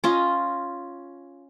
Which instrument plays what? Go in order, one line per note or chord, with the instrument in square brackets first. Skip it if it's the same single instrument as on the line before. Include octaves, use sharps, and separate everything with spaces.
[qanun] C#4 F4 D#5